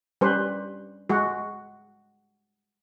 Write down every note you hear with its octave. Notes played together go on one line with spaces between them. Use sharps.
G3 C#4 B4 C5
G#3 F#4